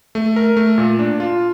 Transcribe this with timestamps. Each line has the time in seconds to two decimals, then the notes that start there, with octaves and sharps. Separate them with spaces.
0.15 A3
0.36 A#4
0.57 A3
0.78 A#2
0.99 D4
1.20 F4